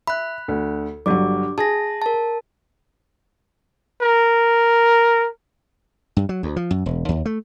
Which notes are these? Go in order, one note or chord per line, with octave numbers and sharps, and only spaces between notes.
E5 B5 F#6
D2
G1 F#3 D4 G4 D6
G#4 A5 A#6
A#4 A5
A#4
G2
F#3
D2
F3
F#2
E1
D#2
A3